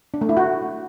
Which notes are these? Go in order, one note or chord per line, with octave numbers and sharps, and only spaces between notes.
D4
A3
E4
F#4